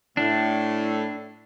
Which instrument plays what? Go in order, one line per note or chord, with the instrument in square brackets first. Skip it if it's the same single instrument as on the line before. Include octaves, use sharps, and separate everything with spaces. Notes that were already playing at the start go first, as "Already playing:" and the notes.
[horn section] A2 [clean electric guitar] D4